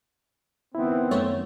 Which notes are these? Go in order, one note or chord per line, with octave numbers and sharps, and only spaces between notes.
F#1 D#3 B3 C4 E4
F#2 A3 C5 C#5